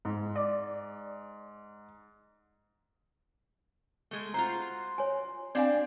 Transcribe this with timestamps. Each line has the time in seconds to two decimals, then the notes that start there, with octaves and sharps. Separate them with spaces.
0.05 G#2
0.36 D5
4.11 G#3 A3
4.34 F4 F#4 C5 A#5
4.98 C#5 G#5
5.55 C4 D4 D5 F5 G#5